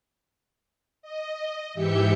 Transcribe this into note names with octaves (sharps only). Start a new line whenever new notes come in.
D#5
G#2 E3 G4 E5 G6 C#7